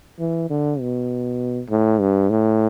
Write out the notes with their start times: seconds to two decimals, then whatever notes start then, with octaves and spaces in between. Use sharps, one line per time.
0.20 E3
0.51 D3
0.80 B2
1.70 A2
2.01 G2
2.30 A2